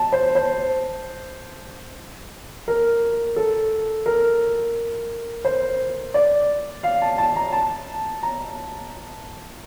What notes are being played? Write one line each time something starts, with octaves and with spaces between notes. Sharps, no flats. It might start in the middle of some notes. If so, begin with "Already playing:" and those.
Already playing: A5
C5
C5
A#4
A4
A#4
C5
D5
F5
A5
A5
A#5
A5
A#5